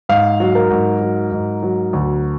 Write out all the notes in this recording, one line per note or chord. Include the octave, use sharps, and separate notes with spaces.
G#2 F5
F#3
A#4
G#2
F#3
G#2
F#3
D2